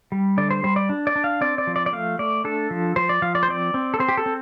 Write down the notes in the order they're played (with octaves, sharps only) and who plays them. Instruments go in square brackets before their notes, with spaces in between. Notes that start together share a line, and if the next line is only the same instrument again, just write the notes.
[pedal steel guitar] G3
D3 D5
C5
G3 C5
D5
D4
D5
D4
F5
C4 D5
D5
F3
D5
D5
A3 F5
A3 D5
D4 A4
F3
F3 C5
D5
F3 F5
D5
C5
C4 D5
C4
A4
C4 C5
G4
A4
C4